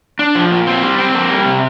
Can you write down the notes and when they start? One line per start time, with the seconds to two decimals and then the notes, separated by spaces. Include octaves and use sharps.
0.19 D4
0.35 F3
0.51 A#2
0.67 C4
0.82 G3
0.98 C4
1.14 A#3
1.30 G3
1.46 C3